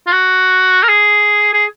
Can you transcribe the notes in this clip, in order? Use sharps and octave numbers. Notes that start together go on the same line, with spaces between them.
F4
F#4
A#4
G#4
G#4